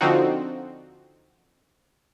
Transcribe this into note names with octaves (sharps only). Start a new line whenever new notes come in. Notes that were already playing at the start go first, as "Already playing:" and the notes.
D3 F3 C4 D#4 F#4